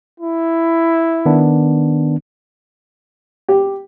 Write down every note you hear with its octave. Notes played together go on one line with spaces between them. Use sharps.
E4
D#3 B3 D4
G4